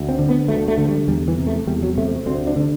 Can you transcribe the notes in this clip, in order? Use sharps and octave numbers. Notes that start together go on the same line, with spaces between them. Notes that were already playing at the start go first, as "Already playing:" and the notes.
Already playing: D2
C4
D3
B3
D2 A3
A3
D3
G3
E2 G3
E3
C3
A3
E2 G3
F#3
C3 A3
D2 C4
D4
D3